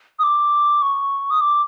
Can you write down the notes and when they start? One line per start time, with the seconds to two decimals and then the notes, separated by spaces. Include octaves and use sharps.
0.19 D#6
0.23 D6
0.82 C#6
1.31 D#6
1.41 D6